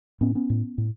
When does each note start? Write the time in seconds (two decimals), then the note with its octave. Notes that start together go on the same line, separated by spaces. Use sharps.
0.21 A2 B3 C#4
0.35 B3 C#4
0.50 A2
0.78 A2